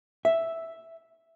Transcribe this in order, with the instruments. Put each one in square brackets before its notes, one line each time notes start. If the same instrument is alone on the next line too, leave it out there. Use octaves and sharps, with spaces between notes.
[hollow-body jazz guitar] E5